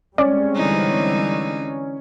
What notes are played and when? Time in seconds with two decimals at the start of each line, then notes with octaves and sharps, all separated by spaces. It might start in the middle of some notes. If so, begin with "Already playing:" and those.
0.18 G3 G#3 C4 C#4 D5
0.56 D3 E3 D#4